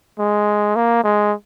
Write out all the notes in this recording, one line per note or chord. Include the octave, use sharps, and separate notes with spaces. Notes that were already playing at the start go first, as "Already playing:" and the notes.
G#3
A#3
G#3